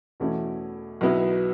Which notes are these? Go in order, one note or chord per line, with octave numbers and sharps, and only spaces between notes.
E2 B2 A3 C#4 E4
B1 B2 F#3 B3 E4